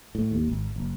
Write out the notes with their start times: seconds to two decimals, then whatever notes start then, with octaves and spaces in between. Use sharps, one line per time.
0.15 A2
0.31 D#2
0.48 G#1
0.76 F#1